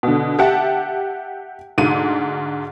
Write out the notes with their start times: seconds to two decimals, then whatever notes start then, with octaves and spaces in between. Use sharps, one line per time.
0.03 B2 D3
0.39 G4 E5 F#5 A5
1.78 D2 G#2 D#7